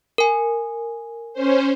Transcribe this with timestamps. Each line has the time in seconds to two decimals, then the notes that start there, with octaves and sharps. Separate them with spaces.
0.18 A#4 G#5
1.33 C#4 C5